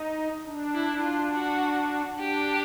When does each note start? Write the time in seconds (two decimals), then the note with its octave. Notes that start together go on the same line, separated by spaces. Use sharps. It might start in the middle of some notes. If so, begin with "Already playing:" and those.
Already playing: D#4
0.46 D4
0.74 E4
1.03 F4
1.32 F#4
2.18 D4 G4